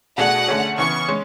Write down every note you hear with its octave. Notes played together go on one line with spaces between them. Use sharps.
B2 A3 D4 G#4 F#5
D3 A3 C#4 G#4
C#3 E3 B3 C#6
G#3 C#4